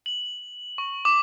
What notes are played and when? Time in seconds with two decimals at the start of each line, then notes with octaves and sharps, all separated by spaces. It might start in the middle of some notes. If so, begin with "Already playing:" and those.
0.06 F#7
0.78 C#6
1.05 D6